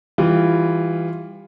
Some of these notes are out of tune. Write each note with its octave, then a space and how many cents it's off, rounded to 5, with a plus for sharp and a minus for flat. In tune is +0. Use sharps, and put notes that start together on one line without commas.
E3 +0 G3 +20 F4 +0